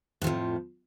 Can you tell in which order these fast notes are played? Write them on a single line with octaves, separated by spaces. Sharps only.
A2 F3 F2